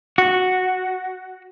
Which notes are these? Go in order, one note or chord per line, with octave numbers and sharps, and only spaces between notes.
F#4